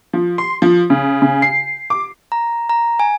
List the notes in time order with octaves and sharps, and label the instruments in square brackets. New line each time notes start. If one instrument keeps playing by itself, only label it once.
[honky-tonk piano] F3
C6
F3
C#3
C#3
C7
D6
[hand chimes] A#5
A#5
G#5